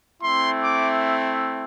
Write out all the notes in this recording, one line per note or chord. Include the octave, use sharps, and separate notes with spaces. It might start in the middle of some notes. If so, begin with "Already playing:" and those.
A3 C4 E4 C6
D6